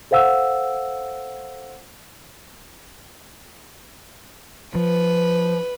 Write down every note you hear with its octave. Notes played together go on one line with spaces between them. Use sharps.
A4 C5 F5 F#5 E6
F3 B4